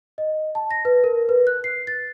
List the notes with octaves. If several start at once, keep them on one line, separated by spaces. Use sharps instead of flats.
D#5
A5
A#6
B4
A#4
B4
F#6
C7
A6